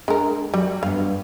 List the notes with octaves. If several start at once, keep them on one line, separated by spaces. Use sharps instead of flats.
G#3 D4 A#4
F#3 G3
G2 B3 F5